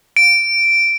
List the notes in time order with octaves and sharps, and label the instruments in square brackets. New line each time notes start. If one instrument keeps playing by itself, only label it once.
[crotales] D7